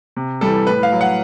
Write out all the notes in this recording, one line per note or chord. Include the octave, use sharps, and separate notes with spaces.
C3
E3 G3 A4
A2 B4
F5
F#3
F#5